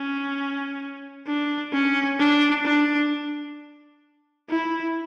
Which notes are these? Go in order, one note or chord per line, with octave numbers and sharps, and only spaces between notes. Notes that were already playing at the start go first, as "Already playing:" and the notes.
Already playing: C#4
D4
C#4
D4
D4
E4